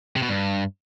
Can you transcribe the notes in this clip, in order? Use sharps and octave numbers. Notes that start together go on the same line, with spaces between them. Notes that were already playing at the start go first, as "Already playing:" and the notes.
C3
B2
G2